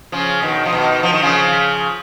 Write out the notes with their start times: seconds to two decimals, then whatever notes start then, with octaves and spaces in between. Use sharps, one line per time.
0.12 C#3 F3
0.42 B2 D#3
0.65 F3
0.73 B2 D#3
1.03 F3
1.13 D#3
1.22 C#3 F3